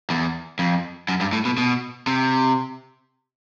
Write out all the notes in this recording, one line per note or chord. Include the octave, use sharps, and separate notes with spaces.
E2
F2
F#2
G2
A2
B2
B2
C3